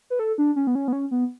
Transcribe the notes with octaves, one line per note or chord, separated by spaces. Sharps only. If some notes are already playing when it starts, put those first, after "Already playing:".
B4
A4
D4
C#4
B3
C#4
B3
C#4
B3